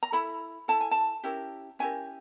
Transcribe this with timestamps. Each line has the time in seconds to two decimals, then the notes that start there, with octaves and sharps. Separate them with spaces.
0.03 A#5
0.12 E4 A4 B5
0.68 E4 A4 A5
0.81 G#5
0.91 A5
1.24 C#4 E4 G4 A#4
1.79 C#4 E4 G4 A#4 G#5